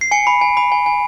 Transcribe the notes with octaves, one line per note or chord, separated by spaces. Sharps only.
C7
G#5 C#7
B5
G#5
B5
G#5
G#5